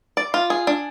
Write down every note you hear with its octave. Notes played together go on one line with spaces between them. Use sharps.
D5
F4
G#4
D4